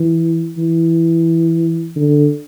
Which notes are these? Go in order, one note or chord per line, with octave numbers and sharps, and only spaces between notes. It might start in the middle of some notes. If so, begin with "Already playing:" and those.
Already playing: E3
E3
D3